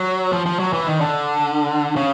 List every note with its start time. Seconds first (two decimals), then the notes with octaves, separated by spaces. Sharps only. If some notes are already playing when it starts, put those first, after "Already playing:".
Already playing: F#3
0.33 F3
0.46 F3
0.59 F#3
0.73 E3
0.87 D#3
1.01 D3
1.96 C#3